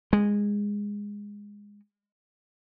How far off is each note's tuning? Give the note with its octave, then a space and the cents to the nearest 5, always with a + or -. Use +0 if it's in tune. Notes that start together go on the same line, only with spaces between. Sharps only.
G#3 -15